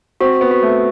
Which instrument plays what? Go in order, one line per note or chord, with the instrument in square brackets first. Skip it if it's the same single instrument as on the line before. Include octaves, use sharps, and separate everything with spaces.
[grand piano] C4 [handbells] F#4
[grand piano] B3
[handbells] F#4
[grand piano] A3